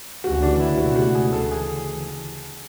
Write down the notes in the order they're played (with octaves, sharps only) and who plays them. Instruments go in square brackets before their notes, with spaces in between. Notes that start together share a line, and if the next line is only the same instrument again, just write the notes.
[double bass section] D2 C#3 E3 A3 C#4 [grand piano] F#4
[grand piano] D4
E4
[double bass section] C#2 B2 A3 [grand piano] F#4
[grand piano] F#4
G#4
[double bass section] D2 C#3 E3 [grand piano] A4
[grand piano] G#4